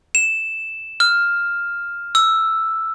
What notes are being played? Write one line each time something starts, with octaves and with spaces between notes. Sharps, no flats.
E7
F6
E6